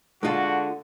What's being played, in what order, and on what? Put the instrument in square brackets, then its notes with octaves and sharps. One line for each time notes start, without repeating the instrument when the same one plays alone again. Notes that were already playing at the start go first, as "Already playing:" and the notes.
[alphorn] D3 [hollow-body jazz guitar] G#3 F4 A4 [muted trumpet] F#4